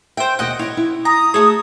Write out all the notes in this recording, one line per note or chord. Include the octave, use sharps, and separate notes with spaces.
C5 E5 G5
D#2 B2 D#5 F#5 G5
E4 C#5 D#5
E4
A#5 D#6
A3 F#4 G#4 A4 C#5